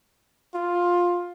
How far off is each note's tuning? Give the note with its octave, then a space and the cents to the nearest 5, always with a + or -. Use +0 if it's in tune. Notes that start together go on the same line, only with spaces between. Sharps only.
F4 +10